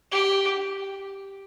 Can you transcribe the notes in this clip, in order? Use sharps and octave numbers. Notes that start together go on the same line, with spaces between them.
G4